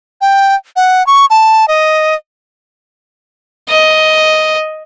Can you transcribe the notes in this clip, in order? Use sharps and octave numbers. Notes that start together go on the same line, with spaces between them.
G5
F#5
C#6
A5
D#5
D#5